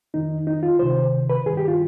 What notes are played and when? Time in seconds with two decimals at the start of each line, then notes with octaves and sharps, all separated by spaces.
0.14 F2 D#3 D#4
0.47 D#4
0.63 F4
0.79 D2 C3 D#3 C5
1.30 B4
1.46 G2 D#3 G#4
1.57 G4
1.68 F4